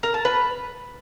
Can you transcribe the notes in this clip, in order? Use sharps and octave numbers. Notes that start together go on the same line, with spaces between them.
A#4
A5
B4